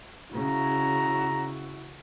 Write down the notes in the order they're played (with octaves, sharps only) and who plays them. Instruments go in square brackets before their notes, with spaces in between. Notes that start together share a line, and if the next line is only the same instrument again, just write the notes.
[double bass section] C#3 [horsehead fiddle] E4 F#4 [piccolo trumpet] A#5